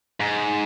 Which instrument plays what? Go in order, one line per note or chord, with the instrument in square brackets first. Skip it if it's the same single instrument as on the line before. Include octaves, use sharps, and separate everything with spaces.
[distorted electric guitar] G#2